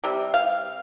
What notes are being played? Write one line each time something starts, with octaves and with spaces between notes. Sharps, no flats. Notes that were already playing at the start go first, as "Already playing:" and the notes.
C3 G3
F5